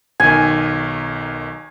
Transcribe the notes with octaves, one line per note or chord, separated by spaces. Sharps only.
B1 D#3 G#5